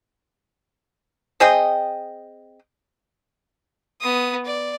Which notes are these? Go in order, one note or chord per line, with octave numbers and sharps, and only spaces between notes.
C4 G#4 D#5 G5
B3 D#6
D5